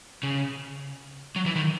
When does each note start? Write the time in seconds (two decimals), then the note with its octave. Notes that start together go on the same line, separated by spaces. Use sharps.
0.23 C#3
1.36 F#3
1.46 E3
1.56 D#3